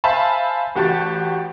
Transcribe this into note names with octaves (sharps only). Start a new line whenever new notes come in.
C5 E5 F5 G#5 A5 B5
A1 F#4 G4 A5 A6